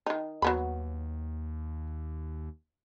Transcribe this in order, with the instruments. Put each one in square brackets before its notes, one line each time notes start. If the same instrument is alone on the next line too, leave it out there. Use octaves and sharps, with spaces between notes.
[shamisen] D#3 D#4
[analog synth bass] D#2 [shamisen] F#3 B3 B5